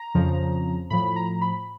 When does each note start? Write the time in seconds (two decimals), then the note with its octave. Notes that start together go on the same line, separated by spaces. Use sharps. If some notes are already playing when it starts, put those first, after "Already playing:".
Already playing: A#5
0.15 F2 C#3 F3
0.90 A2 F3 B5
1.16 A#5
1.41 B5